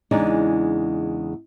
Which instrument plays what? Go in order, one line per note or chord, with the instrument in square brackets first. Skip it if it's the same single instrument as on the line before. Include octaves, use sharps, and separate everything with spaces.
[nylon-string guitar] E2 C#3 G#3 D4 D#4